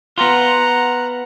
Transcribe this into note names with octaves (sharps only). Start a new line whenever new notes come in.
B3 F4 F#5 A#5